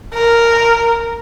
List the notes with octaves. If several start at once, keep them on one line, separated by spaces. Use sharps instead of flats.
A#4